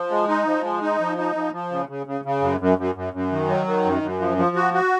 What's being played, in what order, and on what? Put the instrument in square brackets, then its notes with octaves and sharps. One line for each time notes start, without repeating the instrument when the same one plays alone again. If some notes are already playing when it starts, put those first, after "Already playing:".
Already playing: [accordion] F3
G#3
D#4
F3
G#3
D#4
F3
D#4
F3
F3
C#3
C#3
C#3
C#3
F#2
F#2
F#2
F#2
F#2
D#3
F#3
D#3
F#2
F#2
F3
F3
F#4
F#4